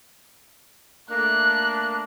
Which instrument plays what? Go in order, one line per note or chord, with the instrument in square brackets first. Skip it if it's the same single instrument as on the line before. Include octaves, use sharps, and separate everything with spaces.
[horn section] A3 A#3 D4 [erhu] F#6